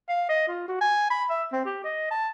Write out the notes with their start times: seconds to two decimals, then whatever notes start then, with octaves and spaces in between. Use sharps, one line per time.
0.09 F5
0.29 D#5
0.48 F4
0.68 F#4
0.81 G#5
1.10 B5
1.30 E5
1.52 C4
1.65 G4
1.84 D#5
2.11 A5